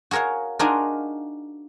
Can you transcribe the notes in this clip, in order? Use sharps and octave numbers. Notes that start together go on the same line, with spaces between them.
F#4 G#4 A#4 C#5 F5
D4 D#4 F4 F#4 G#4 A#4